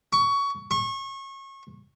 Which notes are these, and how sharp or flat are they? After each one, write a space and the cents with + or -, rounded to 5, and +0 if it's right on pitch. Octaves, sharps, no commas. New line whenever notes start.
C#6 +20
C#6 -30